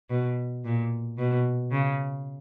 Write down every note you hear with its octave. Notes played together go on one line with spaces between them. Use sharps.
B2
A#2
B2
C#3